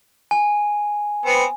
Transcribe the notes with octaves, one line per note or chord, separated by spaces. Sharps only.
G#5
B3 C4